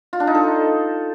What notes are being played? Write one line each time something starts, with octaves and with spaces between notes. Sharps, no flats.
F4
D4
D#4
A4